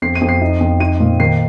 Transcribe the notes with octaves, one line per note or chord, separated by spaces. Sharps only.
F2 C7
D#7
F2
C7
D#4
F2
D#4 D#7
A#2
D#3 C7